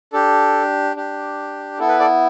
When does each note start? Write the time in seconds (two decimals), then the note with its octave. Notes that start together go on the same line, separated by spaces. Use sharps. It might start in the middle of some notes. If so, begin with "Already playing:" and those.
0.13 D4 G4 A4
0.96 D4 G4
1.79 B3 E4 A4
1.89 B4
2.00 A4 D5